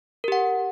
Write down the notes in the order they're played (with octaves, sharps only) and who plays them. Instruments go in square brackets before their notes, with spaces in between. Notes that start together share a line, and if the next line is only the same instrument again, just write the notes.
[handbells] A#4
G4
F#5